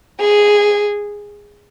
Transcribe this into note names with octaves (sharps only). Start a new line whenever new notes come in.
G#4